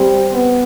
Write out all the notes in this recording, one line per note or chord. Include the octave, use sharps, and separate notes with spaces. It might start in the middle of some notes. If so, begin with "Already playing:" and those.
Already playing: G3 C4
B3